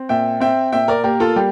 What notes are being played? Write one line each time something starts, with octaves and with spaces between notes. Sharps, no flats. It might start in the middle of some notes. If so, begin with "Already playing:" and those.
Already playing: C4
A#2 E5 G5
C4 E5 G5
A#2 E5 G5
A#4 D5
A#3 G4 A#4
F4 A4
G3 G4